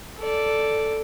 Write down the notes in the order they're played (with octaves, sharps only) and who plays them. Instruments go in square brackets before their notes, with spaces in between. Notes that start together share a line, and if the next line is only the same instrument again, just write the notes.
[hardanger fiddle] A4 D5